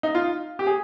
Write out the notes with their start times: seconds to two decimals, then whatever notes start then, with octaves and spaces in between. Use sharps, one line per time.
0.03 D#4
0.15 F4
0.59 G4
0.67 G#4